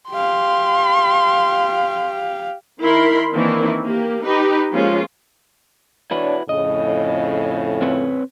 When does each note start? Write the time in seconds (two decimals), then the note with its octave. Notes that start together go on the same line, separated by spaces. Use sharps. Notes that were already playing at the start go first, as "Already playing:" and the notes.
0.11 G4 F5 C6
2.82 D#3 E4 A#4 B5 C6
3.33 D#3 E3 A#3 C4 D4 E4
3.83 A#3 G4
4.24 D#4 G4 B4
4.73 F3 G#3 A#3 C#4 F4
6.11 D4 E4 F#4 B4 C#5
6.49 F2 A2 C#3 D#5
7.82 C4 B4 C#5